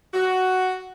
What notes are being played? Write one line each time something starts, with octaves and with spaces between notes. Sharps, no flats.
F#4